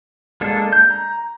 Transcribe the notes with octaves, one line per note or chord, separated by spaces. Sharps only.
G#3 A#3 D4 A4
G6
A#5